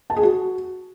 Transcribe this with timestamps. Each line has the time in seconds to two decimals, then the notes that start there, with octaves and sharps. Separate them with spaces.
0.10 A5
0.16 G#4
0.23 F#4